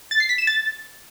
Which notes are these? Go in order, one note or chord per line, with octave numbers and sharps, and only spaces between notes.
A6
C7
B6
E7
A6